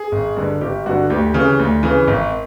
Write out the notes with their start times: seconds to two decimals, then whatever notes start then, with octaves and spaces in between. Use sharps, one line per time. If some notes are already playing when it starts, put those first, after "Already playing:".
Already playing: G#4
0.12 G#1
0.37 G2 D3
0.61 G#1 G4
0.86 G2 D3 F#4
1.10 D2 G4
1.34 C#3 E3
1.59 D2
1.83 C#3 E3
2.07 G#1